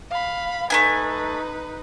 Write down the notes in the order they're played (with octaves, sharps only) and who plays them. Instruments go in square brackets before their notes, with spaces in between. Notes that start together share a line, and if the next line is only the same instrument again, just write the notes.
[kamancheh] F5 B5
[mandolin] A3 B3 G#5 [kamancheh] D#4 B4